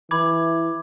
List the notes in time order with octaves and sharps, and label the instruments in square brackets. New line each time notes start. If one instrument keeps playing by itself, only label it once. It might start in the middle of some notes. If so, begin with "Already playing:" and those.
[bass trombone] E3 [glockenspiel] B5 D6 G#6